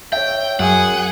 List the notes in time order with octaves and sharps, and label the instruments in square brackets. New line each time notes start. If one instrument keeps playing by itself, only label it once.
[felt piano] C#5 E5 [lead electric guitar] G5
[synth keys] F#2 [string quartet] G#4 [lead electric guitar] F#5